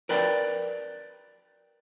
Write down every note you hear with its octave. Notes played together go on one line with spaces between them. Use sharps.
A#4 B4 D5 G5